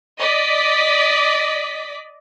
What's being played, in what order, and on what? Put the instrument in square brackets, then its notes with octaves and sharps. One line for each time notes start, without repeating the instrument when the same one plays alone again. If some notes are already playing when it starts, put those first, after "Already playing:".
[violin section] D5 D#5 B6